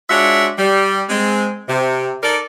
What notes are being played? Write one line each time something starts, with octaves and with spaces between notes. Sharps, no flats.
G#3 D4 F4 F#4 C#5 E5
G3
G#3 C4
C3
D#4 A4 A#4 D5